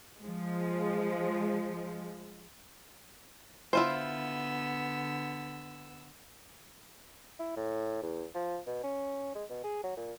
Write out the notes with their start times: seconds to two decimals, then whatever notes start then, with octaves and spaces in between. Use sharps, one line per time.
0.23 F3 G#3
3.73 D3 B3 E4 F4 C5 E6
7.39 E4
7.56 A2
8.02 E2
8.34 F3
8.67 B2
8.83 C#4
9.35 G#3
9.50 B2
9.64 G#4
9.84 F#3
9.97 A#2